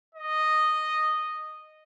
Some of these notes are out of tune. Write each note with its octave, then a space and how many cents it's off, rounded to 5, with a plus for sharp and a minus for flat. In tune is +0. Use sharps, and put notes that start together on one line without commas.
D#5 -10